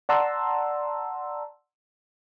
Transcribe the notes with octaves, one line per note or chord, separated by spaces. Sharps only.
D5 F#5 A5 A#5 C6 E6